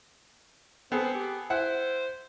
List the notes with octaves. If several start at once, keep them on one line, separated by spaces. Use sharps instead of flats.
B3 C4 G#4 A4
G4
E4 C5 F#5